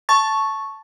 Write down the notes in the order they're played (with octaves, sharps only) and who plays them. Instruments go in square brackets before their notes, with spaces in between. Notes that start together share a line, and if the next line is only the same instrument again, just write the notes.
[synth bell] A5 C#6 A6